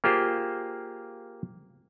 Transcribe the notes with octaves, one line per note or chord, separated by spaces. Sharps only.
A#3 F4 G4 G#4 C5